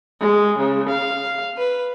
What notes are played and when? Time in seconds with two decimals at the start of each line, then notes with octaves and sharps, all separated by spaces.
0.21 G#3
0.58 C#3
0.90 F5
1.58 B4